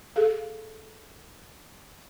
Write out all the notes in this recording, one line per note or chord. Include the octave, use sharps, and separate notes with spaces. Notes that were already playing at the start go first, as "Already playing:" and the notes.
G#4 A4 F5